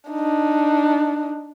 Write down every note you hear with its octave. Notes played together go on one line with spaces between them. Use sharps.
D4 D#4